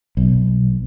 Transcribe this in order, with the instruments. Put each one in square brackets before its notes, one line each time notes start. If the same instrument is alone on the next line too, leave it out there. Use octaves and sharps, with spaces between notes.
[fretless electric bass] B1